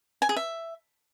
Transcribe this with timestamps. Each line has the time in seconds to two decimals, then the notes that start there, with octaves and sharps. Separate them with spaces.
0.22 G#5
0.29 G#4
0.36 E5